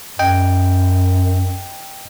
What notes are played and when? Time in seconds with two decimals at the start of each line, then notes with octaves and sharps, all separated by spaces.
0.19 F#2 D#5 G5